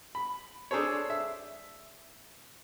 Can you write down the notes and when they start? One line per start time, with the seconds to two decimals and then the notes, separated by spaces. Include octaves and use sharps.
0.15 B5
0.71 D4 G#4 A4 C5 C#5
1.10 E5